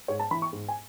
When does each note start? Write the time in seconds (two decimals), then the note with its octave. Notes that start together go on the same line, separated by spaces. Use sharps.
0.08 G#2 C#5
0.20 A5
0.31 E3 B5
0.42 C#6
0.53 G#2
0.68 G#5